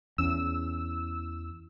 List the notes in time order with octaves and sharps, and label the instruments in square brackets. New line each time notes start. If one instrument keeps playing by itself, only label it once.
[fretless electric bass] E2 C#4 [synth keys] E6